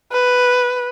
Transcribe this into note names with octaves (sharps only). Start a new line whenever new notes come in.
B4